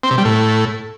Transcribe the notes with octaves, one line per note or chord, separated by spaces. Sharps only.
C4
C3
G3
A2